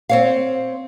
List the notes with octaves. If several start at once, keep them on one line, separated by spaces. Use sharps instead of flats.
C4 C#5 F5